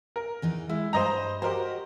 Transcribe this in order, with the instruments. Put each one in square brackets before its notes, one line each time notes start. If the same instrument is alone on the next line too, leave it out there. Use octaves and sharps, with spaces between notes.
[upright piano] A#4
[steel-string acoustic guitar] E2 E3 D#4
[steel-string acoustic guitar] G#3 [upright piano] E4
[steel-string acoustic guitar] G2 G3 [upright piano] C5 D#5 A#5
[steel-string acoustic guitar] F#4 D#5 [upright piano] G4 A#4 C5